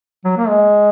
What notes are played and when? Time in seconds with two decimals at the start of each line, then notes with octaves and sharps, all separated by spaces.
0.24 F#3
0.37 A#3
0.48 G#3